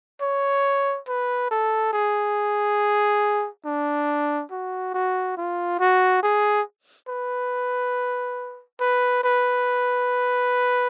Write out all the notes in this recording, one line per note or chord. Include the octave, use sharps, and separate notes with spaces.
C#5
B4
A4
G#4
D4
F#4
F#4
F4
F#4
G#4
B4
B4
B4